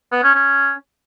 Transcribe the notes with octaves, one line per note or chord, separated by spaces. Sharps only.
B3
C#4
C#4